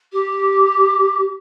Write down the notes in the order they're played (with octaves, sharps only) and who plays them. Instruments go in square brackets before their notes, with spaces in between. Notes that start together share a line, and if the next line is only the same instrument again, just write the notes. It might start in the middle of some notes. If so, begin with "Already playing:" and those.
[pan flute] G4